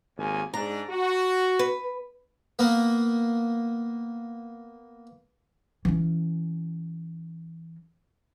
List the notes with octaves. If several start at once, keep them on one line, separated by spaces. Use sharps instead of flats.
G#1 D#2 G#5
G#2 D4 A#5
F#4
B4
A#3 B3
E3 C#4